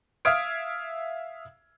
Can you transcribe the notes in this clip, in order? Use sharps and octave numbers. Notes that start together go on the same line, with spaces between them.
E5 F5 D#6 F6 G#6 D7